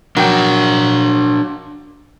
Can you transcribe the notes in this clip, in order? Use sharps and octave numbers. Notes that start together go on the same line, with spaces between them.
F#3 D4 A#4 G5